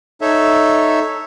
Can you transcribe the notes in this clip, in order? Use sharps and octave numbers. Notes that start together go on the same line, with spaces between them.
D#4 A4 C#5 E5